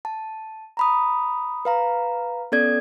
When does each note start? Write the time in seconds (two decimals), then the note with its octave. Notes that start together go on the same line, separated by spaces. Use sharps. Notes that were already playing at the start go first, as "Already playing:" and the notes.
0.05 A5
0.77 A#5 B5 D#6
1.65 B4 F5 A#5
2.52 B3 C#4 A4 D5 G#6